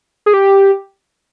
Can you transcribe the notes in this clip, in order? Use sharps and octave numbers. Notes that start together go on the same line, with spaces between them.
G#4
G4